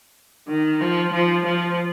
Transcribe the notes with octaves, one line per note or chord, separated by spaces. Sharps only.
D#3
F3
F3
F3